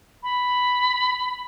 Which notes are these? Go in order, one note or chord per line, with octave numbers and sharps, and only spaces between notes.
B5